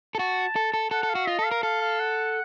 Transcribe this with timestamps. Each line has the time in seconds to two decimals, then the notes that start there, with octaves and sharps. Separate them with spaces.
0.15 A4
0.19 F#4 A5
0.56 A4
0.74 A4
0.91 A4 F#5
1.03 A4
1.09 F5
1.15 F#4
1.27 F4 D#5
1.39 A4
1.45 F5
1.51 A#4
1.63 A4 F5
1.81 F5
2.00 F#5